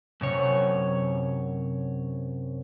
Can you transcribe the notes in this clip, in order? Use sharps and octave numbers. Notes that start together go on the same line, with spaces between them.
F#2 C3 C#5